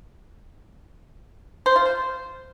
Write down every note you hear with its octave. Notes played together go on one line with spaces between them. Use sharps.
C5
F4
C5